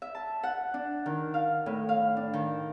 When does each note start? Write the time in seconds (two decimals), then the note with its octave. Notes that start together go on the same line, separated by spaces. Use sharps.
0.02 E5
0.15 A5
0.44 F#5
0.74 D4
1.06 D#3
1.34 F5
1.66 A2
1.89 F5
2.17 D4
2.34 D#3